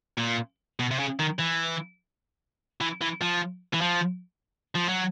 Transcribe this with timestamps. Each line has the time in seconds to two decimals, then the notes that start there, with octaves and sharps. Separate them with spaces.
0.18 A#2
0.80 B2
0.91 C3
0.99 C#3
1.19 D#3
1.39 E3
2.81 E3
3.01 E3
3.21 F3
3.74 E3
3.81 F3
4.75 F3
4.88 F#3